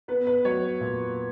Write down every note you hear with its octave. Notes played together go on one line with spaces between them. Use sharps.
B3 B4
B4
F#3 C#5
A#2